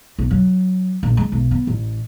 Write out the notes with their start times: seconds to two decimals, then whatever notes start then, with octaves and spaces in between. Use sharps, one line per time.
0.19 B1
0.31 F#3
1.03 A#1
1.17 G#3
1.32 B1
1.51 B3
1.67 A1